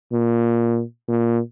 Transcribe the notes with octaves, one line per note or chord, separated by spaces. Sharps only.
A#2
A#2